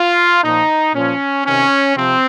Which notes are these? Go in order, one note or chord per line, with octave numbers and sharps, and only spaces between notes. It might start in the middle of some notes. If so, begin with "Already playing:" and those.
Already playing: F4
A#2 F3 D#4
A#2 F3 C#4
C3 D#3 C#4
C3 F3 C4